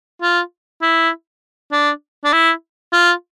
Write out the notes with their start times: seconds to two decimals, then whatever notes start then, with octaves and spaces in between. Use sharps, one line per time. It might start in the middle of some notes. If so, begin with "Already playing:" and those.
0.22 F4
0.82 E4
1.72 D4
2.24 D4
2.33 E4
2.93 F4